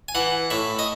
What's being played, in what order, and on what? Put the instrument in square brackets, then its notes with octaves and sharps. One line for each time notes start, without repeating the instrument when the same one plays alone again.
[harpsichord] G#5
E3 F#5
A2 E5
D#5